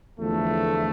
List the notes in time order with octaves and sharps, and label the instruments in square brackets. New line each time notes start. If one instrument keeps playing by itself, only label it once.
[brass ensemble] E2 D3 F3 A3